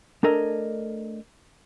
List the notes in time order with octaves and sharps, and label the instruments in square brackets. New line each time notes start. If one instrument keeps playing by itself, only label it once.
[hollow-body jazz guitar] A3 D4 A4 A#4 D#5 G#5